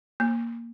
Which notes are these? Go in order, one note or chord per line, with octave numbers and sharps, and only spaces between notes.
A#3